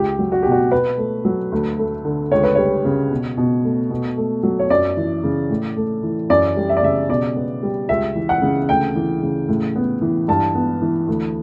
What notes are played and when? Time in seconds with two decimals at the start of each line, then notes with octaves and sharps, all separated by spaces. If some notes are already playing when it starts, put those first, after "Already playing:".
Already playing: C#2 G4
0.19 F#3
0.32 F#4
0.42 B2 G4
0.52 F#4
0.71 B2 B4
0.98 A3
1.25 F#3
1.52 D2
1.79 A3
2.05 D3
2.32 C#2 C#5
2.43 B4
2.55 G3 C#5
2.85 C#3
3.11 B2
3.37 B2
3.64 A3
3.90 B2
4.17 A3
4.43 F#3
4.59 C#5
4.70 F#2 D5
4.97 E3
5.24 C#3
5.50 A2
5.77 A3
6.03 E3
6.30 F#2 D5
6.57 G3
6.69 E5
6.77 D5
6.83 C#3 E5
7.09 B2 D5
7.36 B3
7.63 G3
7.89 C#2 E5
8.15 E3
8.29 F#5
8.42 C#3
8.69 D2 G5
8.95 E3
9.22 C#3
9.48 A2
9.76 B3
10.02 E3
10.28 G2 A5
10.55 B3
10.82 E3
11.08 D2